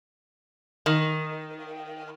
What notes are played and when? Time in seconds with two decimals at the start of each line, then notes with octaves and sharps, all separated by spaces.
0.86 D#3